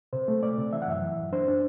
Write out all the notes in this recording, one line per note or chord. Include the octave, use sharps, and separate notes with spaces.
C3 C5
A3
A3 D5
C3
E3 E5
F#5
F#2 E5
E3
F#2
D4 C5
D4